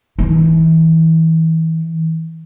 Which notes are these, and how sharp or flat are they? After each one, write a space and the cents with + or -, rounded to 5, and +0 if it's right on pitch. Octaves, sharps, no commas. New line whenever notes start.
E3 -35